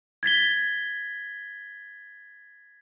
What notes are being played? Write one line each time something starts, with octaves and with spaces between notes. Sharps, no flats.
G#6 A6 B6 G7